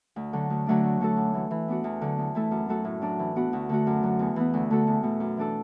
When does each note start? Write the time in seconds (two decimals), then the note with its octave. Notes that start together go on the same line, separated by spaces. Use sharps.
0.16 D2
0.33 D3 F#3
0.50 D2
0.66 D3 F#3 A3 D4
0.84 D2
1.00 D3 A3 F#4 A4
1.17 F#2
1.34 E3 A3
1.51 E3
1.68 B3 D4 F#4
1.84 E2
2.02 D3 F#3
2.18 E2
2.35 E3 A3 E4 A4
2.51 F#2
2.69 F#3 A3 F#4 A4
2.85 A2
3.01 F#3 D4
3.19 E3
3.36 B3 D4 F#4
3.53 D2
3.69 D3 A3 F#4
3.87 F#2
4.03 D3 F#3
4.19 E2
4.36 E3 B3
4.54 D2
4.71 D3 A3 F#4 A4
4.87 E2
5.03 B2 A3
5.20 F#2
5.37 E3 D4 A4